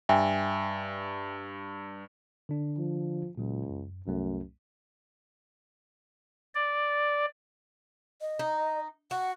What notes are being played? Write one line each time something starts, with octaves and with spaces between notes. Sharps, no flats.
G2 E5 G5 G#5
D3 D4
F3
C#2 A#2 F#3
F#2
C2 F#2 A3
D5
D#5
D#4
F#4 F#5